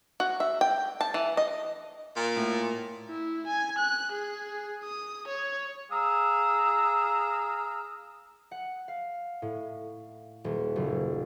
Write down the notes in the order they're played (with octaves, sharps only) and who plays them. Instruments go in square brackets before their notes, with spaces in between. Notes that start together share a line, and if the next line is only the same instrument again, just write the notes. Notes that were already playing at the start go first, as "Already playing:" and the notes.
[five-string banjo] F#4
E5
G5
A5
E3
D#5
[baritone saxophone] A#2
[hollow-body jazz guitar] A2
[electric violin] E4
G#5
F#6
G#4
D#6
C#5
[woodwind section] G#4 F5 A#5 D#6 E6
[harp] F#5
F5
A2
D#1
F#1